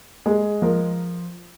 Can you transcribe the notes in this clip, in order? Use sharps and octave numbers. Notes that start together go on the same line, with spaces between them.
G#3 G#4
F3 A#4